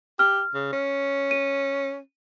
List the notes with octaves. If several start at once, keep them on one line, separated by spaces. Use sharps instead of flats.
G4 F6
C#3
C#4
D#7